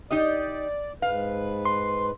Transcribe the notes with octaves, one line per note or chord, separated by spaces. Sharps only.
D#4 G4 D5 D#5
G#2 B4 F5
C6